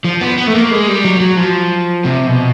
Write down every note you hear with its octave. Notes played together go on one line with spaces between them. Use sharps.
F3
B3
B3
A3
A#3
G#3
G3
F#3
F#3
F3
C3
B2